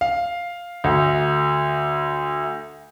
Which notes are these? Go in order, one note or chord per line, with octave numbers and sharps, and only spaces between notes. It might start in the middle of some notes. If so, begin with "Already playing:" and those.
F5
D2